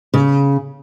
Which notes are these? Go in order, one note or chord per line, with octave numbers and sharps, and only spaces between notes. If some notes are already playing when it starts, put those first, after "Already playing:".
C#3